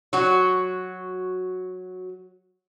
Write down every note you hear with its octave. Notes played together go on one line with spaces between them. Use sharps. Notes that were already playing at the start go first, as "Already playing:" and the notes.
F#3 F#4